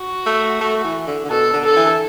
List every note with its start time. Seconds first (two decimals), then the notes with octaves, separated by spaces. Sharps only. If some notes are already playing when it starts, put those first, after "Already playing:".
Already playing: F#4
0.26 A3
0.61 A3
0.84 E3
1.07 D3
1.25 D3
1.30 B2 A4
1.53 D3
1.64 A4
1.76 E3